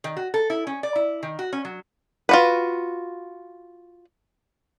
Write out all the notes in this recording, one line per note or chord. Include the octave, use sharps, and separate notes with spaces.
D#3
F#4
A4
E4
C#4
D5
E4
D#3
F#4
C#4
F#3
F4 F#4 B4